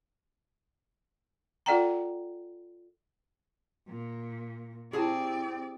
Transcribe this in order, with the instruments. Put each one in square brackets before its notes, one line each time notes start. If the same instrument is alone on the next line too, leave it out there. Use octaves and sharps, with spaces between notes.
[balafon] F4 A4 D5 F#5 G5 A#5
[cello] A#2
[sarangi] C4 [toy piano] E4 G4 [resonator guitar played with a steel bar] G#4 A5 [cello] D5